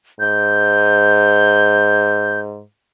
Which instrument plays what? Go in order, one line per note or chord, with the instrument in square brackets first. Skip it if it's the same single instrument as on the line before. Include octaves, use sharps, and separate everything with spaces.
[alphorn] G#2 [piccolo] G6